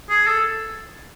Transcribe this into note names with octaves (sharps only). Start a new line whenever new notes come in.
G#4
A4